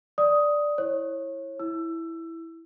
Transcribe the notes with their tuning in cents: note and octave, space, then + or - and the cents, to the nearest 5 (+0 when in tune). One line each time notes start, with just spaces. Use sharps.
D5 +0 D#6 +10
E4 +0 C#5 -30
E4 +0 E6 +20